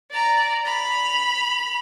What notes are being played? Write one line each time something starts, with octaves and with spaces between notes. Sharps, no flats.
D5 A#5
B5 F7